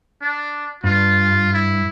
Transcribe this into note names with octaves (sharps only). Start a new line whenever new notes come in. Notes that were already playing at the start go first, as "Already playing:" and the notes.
D4
G2 F4
E4